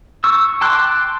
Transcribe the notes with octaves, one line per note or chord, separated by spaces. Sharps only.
C#6 E6
G5 A5 C6 D6 F#6